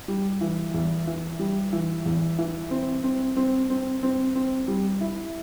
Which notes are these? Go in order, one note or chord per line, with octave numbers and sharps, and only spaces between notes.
G3
E3
E2
E3
G3
E3
E2
E3
C4
C4
C4
C4
C4
C4
G3
E4